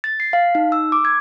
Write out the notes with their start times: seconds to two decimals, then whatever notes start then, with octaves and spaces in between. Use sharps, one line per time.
0.04 A6
0.20 C7
0.33 F5
0.55 D#4
0.72 E6
0.92 D6
1.05 G#6